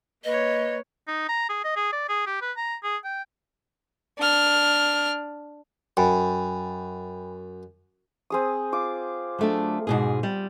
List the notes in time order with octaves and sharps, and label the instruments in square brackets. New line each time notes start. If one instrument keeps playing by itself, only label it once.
[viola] A#3 C#5 [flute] B4 [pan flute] D#5
[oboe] D#4
A#5
G#4
D#5
G#4
D5
G#4
G4
B4
A#5
G#4
G5
[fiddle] D4 F6
[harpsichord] F#2 [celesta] G5 G#5 B5
[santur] C4 G#4 D#6
F4 D6
[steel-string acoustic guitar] F#3 A3 D4
G#2 B2 G#4
G3